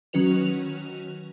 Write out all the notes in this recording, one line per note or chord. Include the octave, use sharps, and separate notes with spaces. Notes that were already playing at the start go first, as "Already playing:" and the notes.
D#3 F#3 C#4 F#4 B4 F7